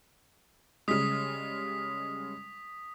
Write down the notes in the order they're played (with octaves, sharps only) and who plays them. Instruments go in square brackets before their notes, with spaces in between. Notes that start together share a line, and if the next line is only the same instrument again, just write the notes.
[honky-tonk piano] C#3 G3 G#3 [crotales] D#6 B6